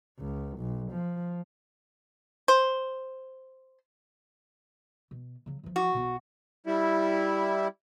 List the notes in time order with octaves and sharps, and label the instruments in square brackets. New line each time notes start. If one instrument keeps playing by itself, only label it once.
[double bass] C#2
B1
F3
[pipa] C5
[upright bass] B2
C#3 F#3
E3 F3
[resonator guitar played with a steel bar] F#4
[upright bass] B1 B2
[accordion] G3 E4